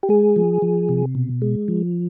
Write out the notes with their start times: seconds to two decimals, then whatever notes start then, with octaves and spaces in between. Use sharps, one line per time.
0.03 G4
0.09 G#3 G#4
0.36 F3
0.62 F3
0.89 C3
1.15 B2
1.42 G#3
1.68 F3